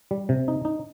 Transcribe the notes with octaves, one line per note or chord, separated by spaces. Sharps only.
G3
C3
D#4
D#4